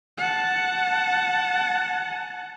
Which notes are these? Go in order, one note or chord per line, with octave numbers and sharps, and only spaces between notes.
F#5 A5